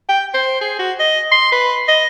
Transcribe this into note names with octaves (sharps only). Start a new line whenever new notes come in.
G5
C5
G#4
F#4
D#5
C6
B4
D#5